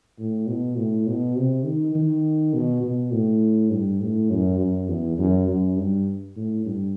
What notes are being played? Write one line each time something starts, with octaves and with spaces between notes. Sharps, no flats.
A2
B2
A2
B2
C3
D#3
D#3
B2
B2
A2
G2
A2
F#2
F#2
E2
F#2
F#2
G2
A2
G2